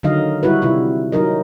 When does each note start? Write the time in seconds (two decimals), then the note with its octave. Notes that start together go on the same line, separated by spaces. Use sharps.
0.03 D3 D#3 F#3 D#4 D#5 F5
0.43 G3 E4 F#4 B4
0.62 C3 E4 F4
1.12 F#3 D#4 A#4 D#5